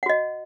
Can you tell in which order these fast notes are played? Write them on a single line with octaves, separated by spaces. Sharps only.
F#5 F#4 D#5